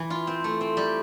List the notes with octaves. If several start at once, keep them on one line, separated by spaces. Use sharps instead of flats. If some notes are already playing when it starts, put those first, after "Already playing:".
Already playing: E3
F4
C4
A3
C4
G3